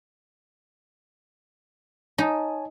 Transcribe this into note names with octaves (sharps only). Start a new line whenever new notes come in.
D#4 C#5 G#5 A5